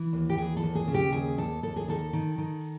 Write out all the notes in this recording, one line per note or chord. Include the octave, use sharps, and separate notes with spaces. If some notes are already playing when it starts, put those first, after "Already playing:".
Already playing: E3
D#2
G4
E3 G#4
A4
D#2
G#4
C#3
G4
D#2 G#4
D#2 A4
D#2 A4
G#4
D#3 A4
D#3
D#3